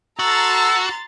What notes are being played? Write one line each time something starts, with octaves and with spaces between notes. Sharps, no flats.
F#4 A4 A#5 C6 E6 A6